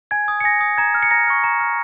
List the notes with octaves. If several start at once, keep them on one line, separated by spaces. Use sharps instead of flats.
G#5 G#6
D#6
C#7
G#5 A#6
D#6
A#5 G#6
F6
C#7
A#5 A#6
C#6 F6
A#5
F6